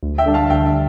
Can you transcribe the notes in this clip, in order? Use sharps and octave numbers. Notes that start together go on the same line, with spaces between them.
D2
E5 G5
D3 G3 D4
F5 A5
D2 E5 G5
E5